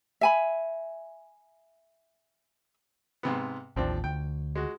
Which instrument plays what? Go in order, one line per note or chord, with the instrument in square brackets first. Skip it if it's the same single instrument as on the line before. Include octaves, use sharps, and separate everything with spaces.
[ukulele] E5 G#5 B5
[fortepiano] G#2 C3 B3
[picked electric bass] A1 D#2 [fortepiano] F3 C4 D4
[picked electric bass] D2 [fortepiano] G5
[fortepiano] G#3 F#4